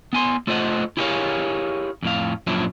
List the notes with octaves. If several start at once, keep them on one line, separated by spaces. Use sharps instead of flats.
B3 G#5 C6
A3 F4 A4 C5 D#5 F#5
E4 G4 G#4 A#4 C#5 F5
F2 A2 F5
F#2 A#2 F3 F#3 D4 E4